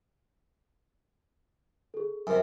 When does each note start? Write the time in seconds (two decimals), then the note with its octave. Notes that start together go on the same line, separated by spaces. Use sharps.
1.94 G#4 A4
2.27 F#2 C3 A#4 G#5